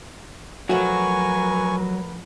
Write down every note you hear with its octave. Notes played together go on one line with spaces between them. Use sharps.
F3 F#3 A3 F#4 A#4 B4 G#5 C#6